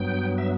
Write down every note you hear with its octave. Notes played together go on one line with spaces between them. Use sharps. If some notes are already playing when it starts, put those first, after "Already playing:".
Already playing: G2 F#3 B3 G5
E5